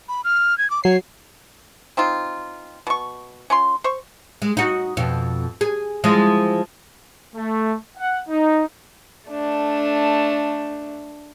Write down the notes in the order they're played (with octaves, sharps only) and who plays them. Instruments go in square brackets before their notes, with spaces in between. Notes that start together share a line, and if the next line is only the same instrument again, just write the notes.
[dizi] B5
F6
G#6
D6
[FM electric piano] F#3 C7 [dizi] C#5
[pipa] C4 D#4 F4
B2 C#6
C#4 F4 C6
C5 C#6
[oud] G#3
D#4 F#4
F2 B2
G#4
E3 F3 G#3
[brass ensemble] A3
F#5
D#4
[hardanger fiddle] A3 D4